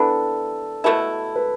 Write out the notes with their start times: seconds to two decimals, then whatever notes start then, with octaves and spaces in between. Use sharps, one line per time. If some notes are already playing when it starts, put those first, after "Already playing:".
Already playing: E3 B3 D4 A4
0.84 B2 A3 E4 A4
1.36 B4